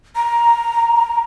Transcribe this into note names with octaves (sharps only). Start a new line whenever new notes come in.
A#5